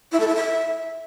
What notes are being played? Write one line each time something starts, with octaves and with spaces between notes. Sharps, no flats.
E4
A4
E4
E5